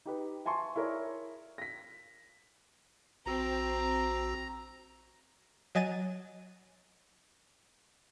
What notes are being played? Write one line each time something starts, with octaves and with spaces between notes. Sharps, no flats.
D#4 G4 B4
E5 G#5 A5 C6 C#6
E4 G#4 A#4 C#5 D5
A#6 B6
A#1 C4 F#4 A#5 E6
F#3 D#5 G#5 A6 D#7